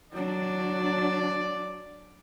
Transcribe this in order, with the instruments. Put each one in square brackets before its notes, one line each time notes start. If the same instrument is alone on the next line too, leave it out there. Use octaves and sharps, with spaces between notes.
[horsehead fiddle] F#3 D4 [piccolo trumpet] D5